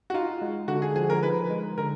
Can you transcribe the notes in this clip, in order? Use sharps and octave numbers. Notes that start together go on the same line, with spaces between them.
F#4
D#4 F4
G#3
D3 F#4
G#4
F3 G#4
A#4
D#4 B4
G#3
D3 A#4